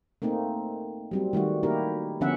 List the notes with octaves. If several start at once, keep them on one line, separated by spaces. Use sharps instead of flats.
A3 A#3 C4 D#4
F#3 G3 C4
D#3 G3 A3 F#4
A#3 D#4 E4 G4 A#4
D3 F3 B3 C#4 E5 F#5